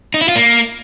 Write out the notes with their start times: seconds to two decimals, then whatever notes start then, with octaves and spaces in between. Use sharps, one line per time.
0.14 D#4
0.21 E4
0.28 F4
0.36 A#3